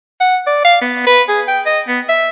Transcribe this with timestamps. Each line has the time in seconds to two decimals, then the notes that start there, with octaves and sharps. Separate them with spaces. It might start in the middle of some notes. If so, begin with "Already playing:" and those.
0.20 F#5
0.47 D5
0.65 F5
0.82 B3
1.06 B4
1.28 G#4
1.48 G5
1.66 D#5
1.88 B3
2.09 E5